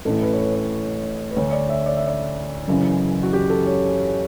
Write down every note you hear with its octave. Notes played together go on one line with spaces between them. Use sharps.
A1 A2 E3 A4
B4
C#5
B4
C#5
B4
D2 D3 C#5
D5
E5
D5
E5
D5
F#1 F#2 C#3 E3
F#4
G4
A4
C#5